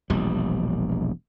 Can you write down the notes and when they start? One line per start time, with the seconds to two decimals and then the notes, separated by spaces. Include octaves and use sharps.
0.10 E1 A#1 G3